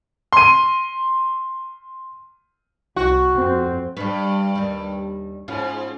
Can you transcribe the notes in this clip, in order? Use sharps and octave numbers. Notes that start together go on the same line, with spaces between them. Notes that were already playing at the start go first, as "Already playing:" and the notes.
C6 D#7
C2 F#4
F2 C4
G2 G3 B4
D#2 G3
G#2 B3 C#4 F4